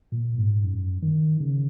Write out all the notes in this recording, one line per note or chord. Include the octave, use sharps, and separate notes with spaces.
A#2
G#2
F#2
D#3
C#3